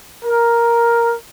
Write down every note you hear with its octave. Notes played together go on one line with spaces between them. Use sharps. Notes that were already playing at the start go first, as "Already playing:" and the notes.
A#4